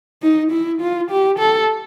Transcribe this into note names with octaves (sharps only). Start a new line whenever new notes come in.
D#4
E4
F4
G4
A4